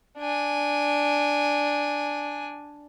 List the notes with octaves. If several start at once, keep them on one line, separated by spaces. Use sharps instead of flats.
D4 G#5